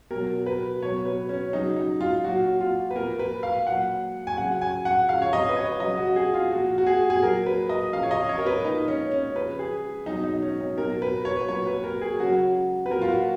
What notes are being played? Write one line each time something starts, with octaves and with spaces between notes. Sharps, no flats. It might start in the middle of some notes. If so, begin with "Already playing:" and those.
B2 F#3 A#4
B4
B2 F#3 C#5
B4
C#4
C#3 F#3 D#4
D#4
F4
A#2 F#3 F#4
F4
B4
A#2 F3 A#4
B4
F5
A#2 F#3 F#5
G#5
C#3 F#3 F#5
G#5
F#5
C#3 F3 F5
C#5
D#5
B4
C#5
C#3 F#3 D#5
F#4
G#4
F4
A#2 F3 F#4
F#4
G#4
G#4
A#2 F#3 A#4
B4
D#5
C#3 F3 F5
C#5
D#5
C#5
A#4
B4
A#2 F3 D#4
C#4
C#4
C#3 F3 B4
G#4
B2 F#3 D#4
D#4
C#4
D#4
B2 F#3 A#4
B4
C#5
B4
A#2 F#3 C#5
B4
A#4
G#4
C#3 F#3 F#4
B4
A#2 F#3 A#4
F4
F#4